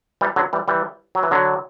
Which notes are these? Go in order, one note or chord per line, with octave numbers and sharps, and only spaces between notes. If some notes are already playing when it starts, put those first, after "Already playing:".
E3 G3
D3 F#3
E3 G3
E3 G3
F#3
E3
D3 F#3